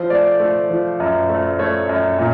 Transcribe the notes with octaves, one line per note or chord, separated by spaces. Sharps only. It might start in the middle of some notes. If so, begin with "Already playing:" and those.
Already playing: F3 C5
A3 D5
A3
F3
F#2
A3
A3 C#5
F#2
A#2